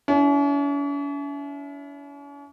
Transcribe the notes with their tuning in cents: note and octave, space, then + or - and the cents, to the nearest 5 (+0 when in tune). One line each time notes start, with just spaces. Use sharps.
C#4 +45 E4 +0